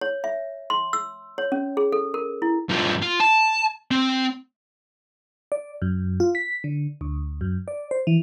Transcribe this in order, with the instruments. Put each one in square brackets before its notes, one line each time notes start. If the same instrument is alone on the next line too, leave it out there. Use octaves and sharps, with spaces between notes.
[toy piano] C#5
E5
C6
E6
C#5
C#4
G#4
A4
A#4
E4
[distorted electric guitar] G2 F3
F4
A5
C4
[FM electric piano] D5
F#2
F4
B6
D3
D2
F#2
D5
C5
E3